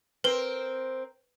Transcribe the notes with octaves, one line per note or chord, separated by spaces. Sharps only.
C4 A#4 B4 G7